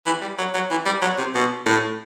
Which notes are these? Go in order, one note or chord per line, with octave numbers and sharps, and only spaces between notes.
E3
G3
F#3
F#3
E3
G3
F#3
C3
B2
A2